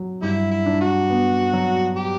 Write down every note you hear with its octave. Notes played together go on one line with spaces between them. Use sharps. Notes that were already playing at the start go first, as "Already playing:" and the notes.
Already playing: F#3
G2 G3 E4
E4
D4
F#4
B3
F#3
G4